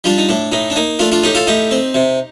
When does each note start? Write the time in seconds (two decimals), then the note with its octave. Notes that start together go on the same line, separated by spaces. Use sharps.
0.04 G3 D4 F4
0.18 D#4
0.29 A2 D4
0.52 A2 D#4
0.70 D4
0.76 A#3 D#4
0.99 A3 D4 F4
1.12 D4 F4
1.23 A2 D#4 G4
1.35 F4 A4
1.47 A2 D#4 G4
1.71 C4
1.94 C3